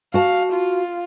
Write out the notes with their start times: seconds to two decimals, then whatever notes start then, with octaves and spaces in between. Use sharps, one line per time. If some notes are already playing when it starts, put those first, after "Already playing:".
0.14 F#4 F5 A5
0.53 F4